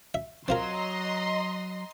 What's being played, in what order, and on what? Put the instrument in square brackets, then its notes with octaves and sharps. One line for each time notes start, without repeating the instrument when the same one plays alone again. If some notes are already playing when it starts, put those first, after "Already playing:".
[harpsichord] E5
[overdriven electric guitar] F#3 [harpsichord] C4 F4 A#4 [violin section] D#5 A#5 C6